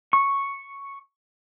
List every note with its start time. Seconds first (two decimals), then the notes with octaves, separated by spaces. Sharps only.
0.13 C#6